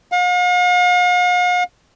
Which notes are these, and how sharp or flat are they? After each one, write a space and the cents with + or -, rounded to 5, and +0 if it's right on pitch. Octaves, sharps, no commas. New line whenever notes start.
F5 +45